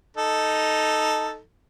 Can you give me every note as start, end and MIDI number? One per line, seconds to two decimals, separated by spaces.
0.17 1.39 63
0.17 1.39 69